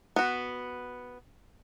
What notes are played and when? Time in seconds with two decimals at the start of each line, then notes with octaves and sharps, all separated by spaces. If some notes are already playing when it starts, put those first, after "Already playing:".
0.16 B3 F#4